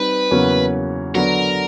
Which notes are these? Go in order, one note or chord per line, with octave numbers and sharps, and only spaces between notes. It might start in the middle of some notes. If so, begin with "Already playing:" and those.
Already playing: G3 C4 D#4 G4 B4
E2 C#3 F#3 A#3 C#4
D3 F#3 B3 D4 A#4